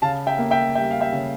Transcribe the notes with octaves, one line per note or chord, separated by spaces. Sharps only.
C#3 F5 A5
E5 G5
A#3
E5 G5
G3 E5 G5
F5
E5 G5
C#3